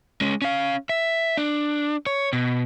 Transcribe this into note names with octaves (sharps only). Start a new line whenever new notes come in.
G#3 C#4
C#4 F5
E5
D4
C#5
B2